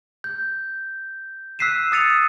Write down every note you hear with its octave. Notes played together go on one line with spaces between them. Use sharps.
G6
E6 F#6 B6 C7 D#7 E7
D#6 E6 A6 C#7 D#7 F7